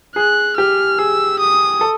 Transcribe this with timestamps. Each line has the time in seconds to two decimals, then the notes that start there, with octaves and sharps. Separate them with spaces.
0.16 G#4 F#6
0.57 G4 F6
0.99 G#4 E6
1.40 D#6
1.81 A4